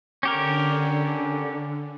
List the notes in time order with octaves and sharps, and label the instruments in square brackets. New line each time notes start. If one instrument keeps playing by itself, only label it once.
[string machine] D3 [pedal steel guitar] C#4 G4 A#4